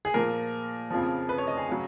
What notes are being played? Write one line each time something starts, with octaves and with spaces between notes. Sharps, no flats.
G#4
A#2 F3 A#4
F2 C#3 F3
B4
C#5
D#5
G#4
C#3 F#3